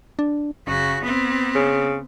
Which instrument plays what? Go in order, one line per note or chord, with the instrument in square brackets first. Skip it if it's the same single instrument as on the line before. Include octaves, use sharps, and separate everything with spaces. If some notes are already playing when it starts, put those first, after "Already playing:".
[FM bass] D4
[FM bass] F#1 [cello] C#3 F#4
[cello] B3 C4
[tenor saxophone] C#3